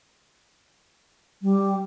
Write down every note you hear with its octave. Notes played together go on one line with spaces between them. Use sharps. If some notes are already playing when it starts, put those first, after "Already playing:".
G3